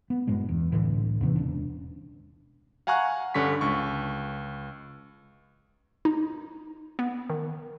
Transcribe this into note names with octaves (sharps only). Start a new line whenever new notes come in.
B3
F#1 G2 A#2 G#3
E2
C2 A2 D3 E3
D#2 C3 D#3 E3
E1 C#4 D4
F5 F#5 G#5 A#5 C#6 F#6
G2 D3 C#4 C#6 B6
C#2 C#6
D#4
B3
D#3